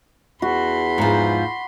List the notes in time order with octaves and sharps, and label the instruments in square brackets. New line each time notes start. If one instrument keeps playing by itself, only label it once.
[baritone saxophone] E2 [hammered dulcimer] F#4 [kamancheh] B5 C6
[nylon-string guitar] G#2 F3